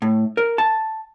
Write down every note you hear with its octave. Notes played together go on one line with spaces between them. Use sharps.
A2
A#4
A5